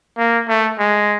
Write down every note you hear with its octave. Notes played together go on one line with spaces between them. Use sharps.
A#3
A3
G#3